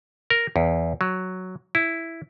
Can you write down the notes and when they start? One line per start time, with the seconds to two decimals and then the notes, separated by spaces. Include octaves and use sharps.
0.30 A#4
0.56 E2
1.01 F#3
1.75 E4